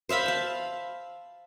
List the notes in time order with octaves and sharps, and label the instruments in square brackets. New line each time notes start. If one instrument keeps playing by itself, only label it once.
[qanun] C5 E5 F5 B5
F5 A5